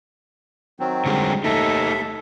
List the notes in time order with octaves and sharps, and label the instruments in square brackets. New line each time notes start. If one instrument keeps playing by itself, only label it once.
[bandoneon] D#3 F#3 C4
[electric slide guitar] D3 G3 G#3
[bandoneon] D#2 A4 E5 [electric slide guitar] A3 D#4